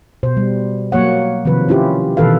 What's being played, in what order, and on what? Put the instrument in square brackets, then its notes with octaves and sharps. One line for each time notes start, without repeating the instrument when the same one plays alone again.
[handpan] B2 C5
G3
F#3 A#3 C#5 F#5
C3 D#3 F3 B4
C#4 E4 F4 G4
B2 D#3 E3 A4 B4 F5